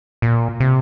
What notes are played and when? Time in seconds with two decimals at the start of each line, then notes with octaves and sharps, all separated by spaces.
0.22 A#2
0.60 C3